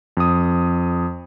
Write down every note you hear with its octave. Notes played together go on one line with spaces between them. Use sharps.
F2 D#6